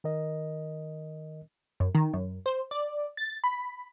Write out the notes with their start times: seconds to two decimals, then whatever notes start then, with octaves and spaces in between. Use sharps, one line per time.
0.04 D#3 A#4 D#5
1.80 F#2
1.95 D#3
2.13 F#2
2.46 C5
2.71 D5
3.17 A6
3.44 B5